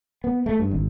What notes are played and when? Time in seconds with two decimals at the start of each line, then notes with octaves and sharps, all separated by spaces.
0.24 B3
0.46 A3
0.59 G2
0.71 G#1